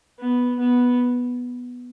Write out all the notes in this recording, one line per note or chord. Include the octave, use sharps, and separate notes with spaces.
B3
B3